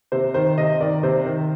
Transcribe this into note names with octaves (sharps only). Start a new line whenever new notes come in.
C3 C5
D#3 C5
C3 D#5
D#3 D5
C3 C5
D#3